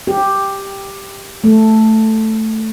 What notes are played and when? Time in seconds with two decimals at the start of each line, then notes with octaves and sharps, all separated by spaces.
0.07 G4
1.44 A3